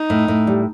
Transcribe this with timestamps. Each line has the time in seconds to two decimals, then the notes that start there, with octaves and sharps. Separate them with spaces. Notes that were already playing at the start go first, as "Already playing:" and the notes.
Already playing: D#4
0.10 A2
0.28 A2
0.47 G3